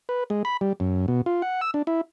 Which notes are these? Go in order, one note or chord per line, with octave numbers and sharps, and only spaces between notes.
B4
G#3
B5
G3
F#2
B2
F4
F#5
E6
D4
E4